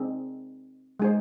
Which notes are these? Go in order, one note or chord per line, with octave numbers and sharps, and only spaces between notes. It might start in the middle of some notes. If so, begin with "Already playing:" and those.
Already playing: C4 D#4 G#4
G#3 D#4 G#4 C5